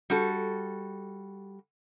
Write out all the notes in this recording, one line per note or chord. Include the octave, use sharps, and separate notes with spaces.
G3 F#4 A4